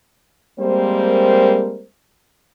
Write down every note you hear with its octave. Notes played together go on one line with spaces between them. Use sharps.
G3 G#3 A#3 C4 A#4 C5